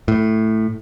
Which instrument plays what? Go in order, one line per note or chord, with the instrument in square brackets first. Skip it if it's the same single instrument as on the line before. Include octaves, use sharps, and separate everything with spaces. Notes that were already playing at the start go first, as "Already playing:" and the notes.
[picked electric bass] A2